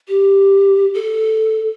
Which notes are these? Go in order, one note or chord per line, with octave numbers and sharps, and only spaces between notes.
G4
A4